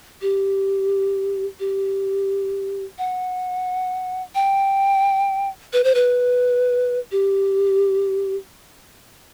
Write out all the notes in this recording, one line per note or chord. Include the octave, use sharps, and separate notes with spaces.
G4
G4
F#5
G5
B4
C5
B4
G4